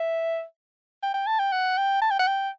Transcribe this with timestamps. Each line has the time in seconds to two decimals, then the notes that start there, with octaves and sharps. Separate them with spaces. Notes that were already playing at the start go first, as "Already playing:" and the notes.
Already playing: E5
1.03 G5
1.14 G5
1.27 A5
1.39 G5
1.52 F#5
1.77 G5
2.01 A5
2.11 G5
2.19 F#5
2.27 G5